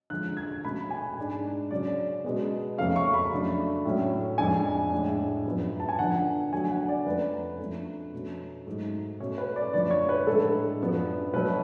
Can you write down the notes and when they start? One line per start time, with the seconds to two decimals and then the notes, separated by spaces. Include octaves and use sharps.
0.10 D3 F3 G#3 C#4 F#6
0.37 G#6
0.64 B2 A3 C#4 B5
0.91 G#5
1.17 G#2 G#3 D4
1.71 C#3 F#3 C#4 D5
2.25 B2 G#3 B3
2.78 F2 C#3 F3 A3 C#4 F5
2.96 C#6
3.14 B5
3.31 C#3 F#3 A3 D4
3.85 A2 F#3 A3 C#4
4.38 F2 F3 G#3 D4 G#5
4.92 A2 G#3 D4
5.46 F#2 F3 B3
5.80 A5
5.89 G#5
5.99 D3 F3 B3 D4 F#5
6.52 D3 F#3 A3 D4 G#5
6.71 F#5
6.88 D5
7.06 F2 F3 A3 C#4 B4
7.60 F2 F3 A3 D4
8.13 B2 A3 C#4
8.66 G#2 F#3 A3
9.20 B2 A3 C#4 C#5
9.38 B4
9.56 D5
9.73 F#2 D3 F3 A3 D5
9.91 C#5
10.09 B4
10.27 A2 G#3 D4 A4
10.81 F#2 F3 B3 D4
11.33 B2 F#3 A3 C#4 B4